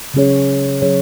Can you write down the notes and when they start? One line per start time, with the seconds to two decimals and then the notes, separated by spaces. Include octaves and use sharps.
0.14 C#3 F#3 C#4 G#4 C#5
0.82 C#3 F#3 C#4 G#4 C#5